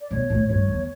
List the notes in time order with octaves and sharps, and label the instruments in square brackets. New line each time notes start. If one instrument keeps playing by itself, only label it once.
[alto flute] D5
[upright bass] B2 [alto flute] C#5
[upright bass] A2
[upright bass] G2 [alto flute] C#5
[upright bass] E2